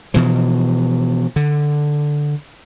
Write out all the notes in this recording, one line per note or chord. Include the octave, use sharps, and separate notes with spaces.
B2 E3 F3
D3